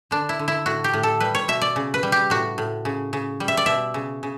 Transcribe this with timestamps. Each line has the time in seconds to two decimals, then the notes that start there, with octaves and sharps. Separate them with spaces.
0.11 D3 D4
0.29 E4
0.39 D3
0.48 E4
0.66 A2 F#4
0.84 G4
0.93 A2
1.03 A4
1.20 G3 B4
1.35 C#5
1.48 B2 E5
1.61 D5
1.76 C#3
1.94 B4
2.03 G3
2.12 G4
2.30 A2 F#4
2.58 A2
2.85 C#3
3.13 C#3
3.40 G3
3.48 E5
3.57 D5
3.66 B2 E5
3.94 C#3
4.23 C#3